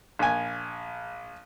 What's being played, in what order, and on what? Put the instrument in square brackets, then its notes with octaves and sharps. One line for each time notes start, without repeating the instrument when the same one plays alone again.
[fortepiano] A#1 G#5